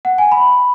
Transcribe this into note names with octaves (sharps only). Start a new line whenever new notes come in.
F#5
G#5
B5